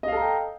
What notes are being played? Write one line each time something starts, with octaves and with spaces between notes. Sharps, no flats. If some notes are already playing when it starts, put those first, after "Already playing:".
A4 D#5 F5 G5 A#5